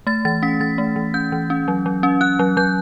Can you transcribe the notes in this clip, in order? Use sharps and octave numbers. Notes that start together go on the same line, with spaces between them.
A3 A6
E3 A6
C#4 B6
E3 A6
A3
E3
C#4 G6
E3
C#4
F#3
F#3
C#4
C#4 F#6
F#3
F#3 G6